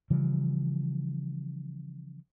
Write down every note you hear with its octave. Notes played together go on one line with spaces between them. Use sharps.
C#3 E3 F3 G3